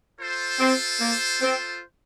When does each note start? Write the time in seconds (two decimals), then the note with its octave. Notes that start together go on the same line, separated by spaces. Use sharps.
0.19 F4 A4 C5
0.60 C4
1.00 A#3
1.42 C4